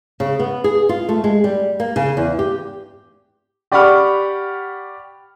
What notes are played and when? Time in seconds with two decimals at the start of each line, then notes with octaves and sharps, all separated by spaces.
0.20 C#3
0.39 B3
0.64 G#4
0.89 F4
1.09 A3
1.24 G#3
1.44 G3
1.80 A#3
1.96 C#3
2.17 E2
2.39 G4
3.72 G4 D5 F#5 B5 C#6 F6